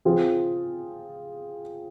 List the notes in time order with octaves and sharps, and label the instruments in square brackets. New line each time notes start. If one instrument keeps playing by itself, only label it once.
[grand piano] F3 C4 F4 G#4